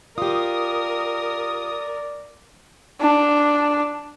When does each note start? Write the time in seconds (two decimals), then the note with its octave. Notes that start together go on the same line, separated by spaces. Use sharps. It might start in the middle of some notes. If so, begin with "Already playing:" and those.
0.18 F4 G4 A#4 D5 D#6
3.01 D4